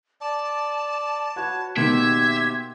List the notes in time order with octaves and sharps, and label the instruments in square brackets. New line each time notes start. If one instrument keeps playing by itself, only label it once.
[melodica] D5 [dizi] A5
[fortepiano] F#4 [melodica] B4 C#5
[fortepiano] B2 D#3 A#3 [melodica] G4 C5 [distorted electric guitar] E5 [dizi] G#6